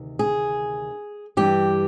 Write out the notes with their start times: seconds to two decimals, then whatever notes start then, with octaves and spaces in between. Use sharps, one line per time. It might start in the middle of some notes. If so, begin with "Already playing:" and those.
Already playing: D2 C3 D#3
0.19 G#4
1.37 G2 E3 G4